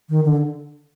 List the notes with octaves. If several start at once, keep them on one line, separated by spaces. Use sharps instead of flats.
D#3
D3